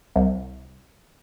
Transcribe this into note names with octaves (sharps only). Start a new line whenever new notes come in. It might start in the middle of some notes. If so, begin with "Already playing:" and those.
C2